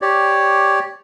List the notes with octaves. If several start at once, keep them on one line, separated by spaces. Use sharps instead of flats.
G4 C#5 D5